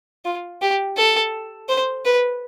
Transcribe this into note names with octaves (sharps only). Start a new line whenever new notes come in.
F4
G4
A4
C5
B4